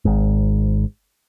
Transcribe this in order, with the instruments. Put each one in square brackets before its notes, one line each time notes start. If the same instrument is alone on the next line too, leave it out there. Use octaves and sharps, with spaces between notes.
[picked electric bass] G#1 G#2